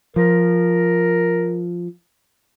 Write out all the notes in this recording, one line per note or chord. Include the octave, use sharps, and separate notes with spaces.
F3 A#4